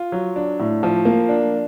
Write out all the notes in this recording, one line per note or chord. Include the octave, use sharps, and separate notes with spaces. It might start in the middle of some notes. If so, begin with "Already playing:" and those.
Already playing: F4
F#3
D4
A2
F3
A#3
D4